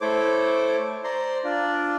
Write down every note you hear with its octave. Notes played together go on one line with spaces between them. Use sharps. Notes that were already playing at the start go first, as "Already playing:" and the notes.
A3 E4 A4 C5 C#5 D6
C5 D5 A#5 C6
D4 F4 D5